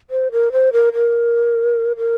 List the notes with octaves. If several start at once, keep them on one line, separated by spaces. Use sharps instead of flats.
C5
A#4
C5
A#4
A#4
A#4